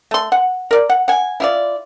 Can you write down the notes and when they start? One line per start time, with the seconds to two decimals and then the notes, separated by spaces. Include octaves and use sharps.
0.11 A3 C6
0.32 F#5
0.71 A#4 D5
0.90 F#5
1.08 F#5 G#5
1.40 E4 F4 D5